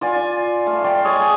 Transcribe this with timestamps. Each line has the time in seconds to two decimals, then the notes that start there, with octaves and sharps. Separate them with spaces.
0.01 F4 D5 G#5
0.66 A3 F5
0.84 D5 F5 G5 C6
1.04 G#4 C#5 D#5 G#5